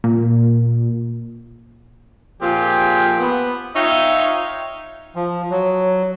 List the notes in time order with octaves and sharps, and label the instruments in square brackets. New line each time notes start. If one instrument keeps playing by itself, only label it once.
[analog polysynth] A#2
[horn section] A#2 F3 C4 F4 G4 G#4
B3
D#4 F4 C#5 E5 F5 G5
[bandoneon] F3
F#3